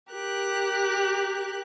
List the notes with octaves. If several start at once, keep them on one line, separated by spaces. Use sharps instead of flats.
G4 A#4 F#6